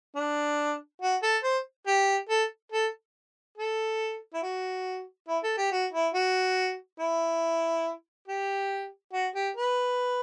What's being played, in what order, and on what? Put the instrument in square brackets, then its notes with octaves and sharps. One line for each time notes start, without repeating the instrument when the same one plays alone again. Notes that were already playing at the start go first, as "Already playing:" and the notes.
[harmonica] D4
F#4
A4
C5
G4
A4
A4
A4
E4
F#4
E4
A4
G4
F#4
E4
F#4
E4
G4
F#4
G4
B4